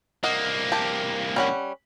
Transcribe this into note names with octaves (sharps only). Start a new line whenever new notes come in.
C2 A#3 D#5 F#5
G4 A5
G3 C#4 F#5